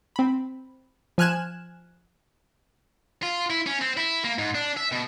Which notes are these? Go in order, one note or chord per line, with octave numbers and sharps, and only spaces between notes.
C4 B5
F3 G#5 F6 F#6 G#6 E7
F4
E4
C#4
C4
E4
A#3
G#2
D4
E5
B2